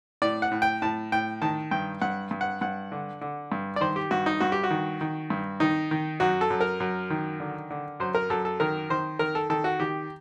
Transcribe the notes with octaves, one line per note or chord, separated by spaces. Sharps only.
A2 D5
F#5
A2
G5
A2 A5
A2 G5
D#3 A5
G2 G5
G2 F#5
G2
F#5
G2 F#5
D3
D3
G2
D5
D#3 C5
G4
G2 F#4
D#4
G2 F#4
G4
F#4
D#3
D#3
G2
D#3 D#4
D#3
F#2 F#4
A4
F#2
A#4
F#2
D#3
D3
D3
F#2 C5
A#4
F#2 A4
A4
D#3 A#4
D#3 C5
D#3 A#4
A4
D#3 A4
F#4
D#3 G4